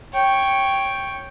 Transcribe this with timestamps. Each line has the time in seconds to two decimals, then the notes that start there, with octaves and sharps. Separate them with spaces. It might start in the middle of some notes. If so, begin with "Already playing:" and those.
0.13 C#5 G5